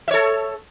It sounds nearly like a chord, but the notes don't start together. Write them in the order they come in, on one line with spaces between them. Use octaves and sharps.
E5 C#5 A4